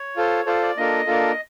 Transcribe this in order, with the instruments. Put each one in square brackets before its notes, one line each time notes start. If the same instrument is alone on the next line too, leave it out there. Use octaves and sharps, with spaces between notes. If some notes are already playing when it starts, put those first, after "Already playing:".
Already playing: [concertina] C#5
[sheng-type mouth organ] F4 A4 C5
[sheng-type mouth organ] F4 A4 C5 [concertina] D5
[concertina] D5
[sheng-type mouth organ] A#3 D4 F4 A4 [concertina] D#5
[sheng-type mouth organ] A#3 D4 F4 A4